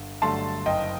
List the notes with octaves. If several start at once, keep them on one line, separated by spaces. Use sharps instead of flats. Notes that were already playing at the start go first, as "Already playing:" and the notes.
Already playing: G1
G2 D3 F#3 A3 A5 C6
F#1 D#5 G5